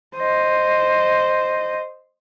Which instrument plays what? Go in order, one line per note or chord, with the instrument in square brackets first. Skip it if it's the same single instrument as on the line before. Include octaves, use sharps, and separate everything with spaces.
[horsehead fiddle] C5 D#5